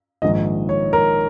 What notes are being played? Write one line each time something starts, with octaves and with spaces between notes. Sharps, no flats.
A#1 G#2 D#3 D#5
C#5
A#4